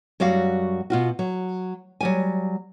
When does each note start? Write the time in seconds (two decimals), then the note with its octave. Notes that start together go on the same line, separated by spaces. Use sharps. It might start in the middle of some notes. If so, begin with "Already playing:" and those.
0.20 F#2 F#3 G3 F#4 F5
0.90 B2 F4 F#4
1.19 F#3
2.01 F#3 G3 G#5